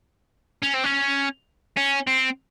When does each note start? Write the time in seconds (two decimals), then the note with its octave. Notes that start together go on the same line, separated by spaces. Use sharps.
0.62 C#4
0.74 C4
0.84 C#4
1.77 C#4
2.07 C4